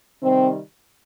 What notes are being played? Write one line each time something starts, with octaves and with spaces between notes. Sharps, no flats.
C3 D#3 G3 C4